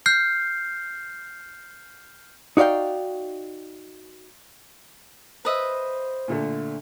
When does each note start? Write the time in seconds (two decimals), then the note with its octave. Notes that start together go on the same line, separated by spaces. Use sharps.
0.06 F6 G6 C7
2.57 D#4 F#4 D5 F5 G5
5.45 B4 C5 D#5 E5
6.28 A#2 D3 A3